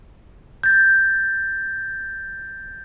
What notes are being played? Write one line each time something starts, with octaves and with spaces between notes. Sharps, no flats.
G6 A6